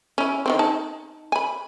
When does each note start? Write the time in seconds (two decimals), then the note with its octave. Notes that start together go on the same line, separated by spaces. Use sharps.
0.18 C#4 E4
0.46 D#3 E3 C4
0.59 D#4 A5
1.32 G#5 B5